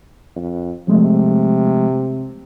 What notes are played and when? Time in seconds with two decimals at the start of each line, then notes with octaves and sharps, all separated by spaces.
0.36 F2
0.88 C3 F3 G#3 A3